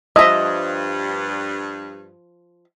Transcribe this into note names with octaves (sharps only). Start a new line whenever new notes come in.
G2 F3 D#5 E5 D#6